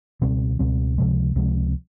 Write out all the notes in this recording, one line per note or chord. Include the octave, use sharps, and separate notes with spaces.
C#2 B2 G3 C4
C#2 B2 G3 C4
C#2 C3 F3 G#3
C#2 C3 F3 G#3